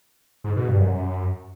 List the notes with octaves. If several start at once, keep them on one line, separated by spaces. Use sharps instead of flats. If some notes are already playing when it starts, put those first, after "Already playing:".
G#2
B2
G2
F#2